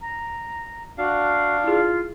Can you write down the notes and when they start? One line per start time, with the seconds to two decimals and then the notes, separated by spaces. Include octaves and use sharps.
0.01 A#5
0.98 D4 F#4 F5
1.64 E4 F4 G#4